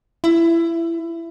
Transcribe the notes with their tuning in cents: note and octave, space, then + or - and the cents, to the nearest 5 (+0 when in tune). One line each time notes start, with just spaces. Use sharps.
E4 +20